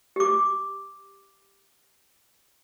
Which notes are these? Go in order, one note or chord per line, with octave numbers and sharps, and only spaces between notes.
G4 D6